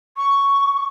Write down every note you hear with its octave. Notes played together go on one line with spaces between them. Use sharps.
C#6